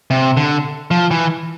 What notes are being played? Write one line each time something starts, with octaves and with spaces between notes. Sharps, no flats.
C3
D3
F3
E3